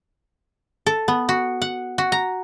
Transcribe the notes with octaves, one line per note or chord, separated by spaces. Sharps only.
A4
B3
F#4
F#5
F#4
A#5